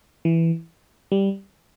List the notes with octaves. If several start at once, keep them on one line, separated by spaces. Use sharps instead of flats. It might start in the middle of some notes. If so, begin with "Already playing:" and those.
E3
G3